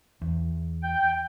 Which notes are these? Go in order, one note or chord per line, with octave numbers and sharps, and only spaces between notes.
E2
G5